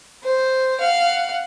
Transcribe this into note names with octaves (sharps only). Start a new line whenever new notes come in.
C5
F5 F#5